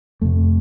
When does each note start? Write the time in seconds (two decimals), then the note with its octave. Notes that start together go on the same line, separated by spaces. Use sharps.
0.21 F2 C3 A3